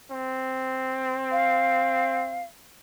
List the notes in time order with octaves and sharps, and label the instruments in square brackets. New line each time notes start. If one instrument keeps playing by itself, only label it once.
[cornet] C4
[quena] F5